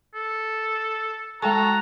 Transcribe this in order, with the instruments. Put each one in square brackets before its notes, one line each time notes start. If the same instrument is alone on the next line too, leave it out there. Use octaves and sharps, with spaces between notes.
[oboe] A4
[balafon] G#3 G5 C#6 [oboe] F#4 [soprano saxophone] A4 [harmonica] A#5